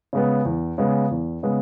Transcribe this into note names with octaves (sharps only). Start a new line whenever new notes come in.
C#3 G#3 B3
E2
C#3 G#3 B3
E2
C#3 G#3 B3